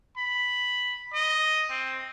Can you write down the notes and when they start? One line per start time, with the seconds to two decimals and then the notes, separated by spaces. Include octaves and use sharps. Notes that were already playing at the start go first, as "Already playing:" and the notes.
0.17 B5
1.14 D#5
1.70 C4